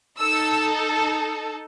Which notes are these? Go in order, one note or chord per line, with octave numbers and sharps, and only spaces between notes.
D#4 A4 E6